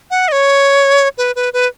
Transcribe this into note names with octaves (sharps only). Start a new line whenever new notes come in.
F#5
D#5
C#5
B4
B4
B4